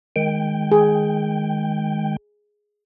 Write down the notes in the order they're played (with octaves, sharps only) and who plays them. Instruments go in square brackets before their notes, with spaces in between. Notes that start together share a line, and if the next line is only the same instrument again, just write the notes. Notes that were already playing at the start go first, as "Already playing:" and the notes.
[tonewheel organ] D#3 G#3 G5
[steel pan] G#4